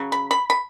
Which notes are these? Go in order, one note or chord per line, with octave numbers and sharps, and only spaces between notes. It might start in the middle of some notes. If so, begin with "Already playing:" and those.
Already playing: C#3 F#3
B5
B5
B5